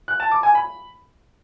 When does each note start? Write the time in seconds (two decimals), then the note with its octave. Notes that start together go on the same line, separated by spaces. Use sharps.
0.08 F#6
0.20 A5
0.31 D6
0.43 G#5
0.55 B5